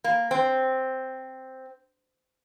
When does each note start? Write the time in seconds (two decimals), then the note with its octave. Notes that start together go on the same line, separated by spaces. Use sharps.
0.04 A#3
0.31 C4